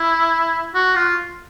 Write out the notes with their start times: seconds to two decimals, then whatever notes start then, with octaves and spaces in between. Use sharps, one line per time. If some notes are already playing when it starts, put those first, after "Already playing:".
Already playing: E4
0.74 F#4
0.95 F4